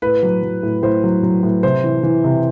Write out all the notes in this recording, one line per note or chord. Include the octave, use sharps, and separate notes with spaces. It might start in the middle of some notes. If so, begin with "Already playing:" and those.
A2 B4
F#3
F#3
A2
A2 C5
F#3
F#3
A2
C3 C5
E3
E3
C3